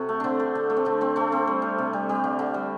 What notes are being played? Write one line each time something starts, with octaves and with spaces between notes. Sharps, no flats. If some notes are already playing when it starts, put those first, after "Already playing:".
Already playing: C3 F#4 A4
A3
D3 C4 D4
A3
D3
A3
C4
D3 D4
A3 C4
A3 D4
A3 C4
G3
G3
C3
G3
G3
D3
D3
G3